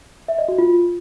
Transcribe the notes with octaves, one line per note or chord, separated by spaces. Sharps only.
E5
D#5
F#4
F4